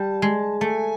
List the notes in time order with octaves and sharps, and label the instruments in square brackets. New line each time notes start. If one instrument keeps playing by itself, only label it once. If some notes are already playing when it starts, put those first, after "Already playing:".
Already playing: [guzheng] G3 [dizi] A5
[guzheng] G#3
[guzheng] A3 [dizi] G#5 A5